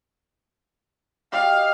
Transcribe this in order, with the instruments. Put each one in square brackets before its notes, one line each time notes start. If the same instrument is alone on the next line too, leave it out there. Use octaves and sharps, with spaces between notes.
[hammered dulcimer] G4 D#5 [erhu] F5